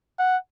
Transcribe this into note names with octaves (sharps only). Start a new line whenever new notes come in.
F#5